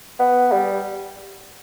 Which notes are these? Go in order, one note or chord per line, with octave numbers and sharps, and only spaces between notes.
B3
G3